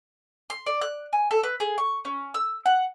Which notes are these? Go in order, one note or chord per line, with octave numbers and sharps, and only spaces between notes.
C6
D5
F#6
G#5
A4
B4
G#4
C#6
C#4
E6
F#5